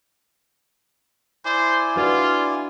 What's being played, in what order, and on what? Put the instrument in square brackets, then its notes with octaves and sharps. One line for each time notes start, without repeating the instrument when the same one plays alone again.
[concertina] E4 G#5 [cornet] C5 [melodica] D5
[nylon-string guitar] D4 F#4 B4 [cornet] F4